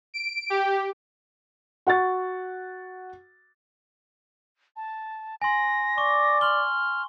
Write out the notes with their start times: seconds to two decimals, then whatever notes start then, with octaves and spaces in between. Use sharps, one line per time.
0.14 D7
0.50 G4
1.87 F#4 F#5 C#6 A6
4.76 A5
5.42 G#5 C6 A#6
5.98 D5 C#6
6.41 C6 F6 G7